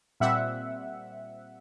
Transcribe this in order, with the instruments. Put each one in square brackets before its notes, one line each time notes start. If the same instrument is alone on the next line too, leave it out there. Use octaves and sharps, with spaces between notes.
[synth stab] A#2 G3 C4 E5 F#5